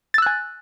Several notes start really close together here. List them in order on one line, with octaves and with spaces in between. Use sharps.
A6 E6 F#6 G#5